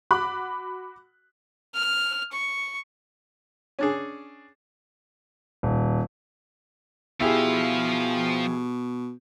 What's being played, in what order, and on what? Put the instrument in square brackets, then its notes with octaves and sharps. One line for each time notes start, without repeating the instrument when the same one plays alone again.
[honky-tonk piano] F#4 B5 D6 F#6
[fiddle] F6
C#6
[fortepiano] C#4 D4 G#4
[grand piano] D#1
[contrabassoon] B2 [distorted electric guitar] F3 F5 [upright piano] E4 G4 G#4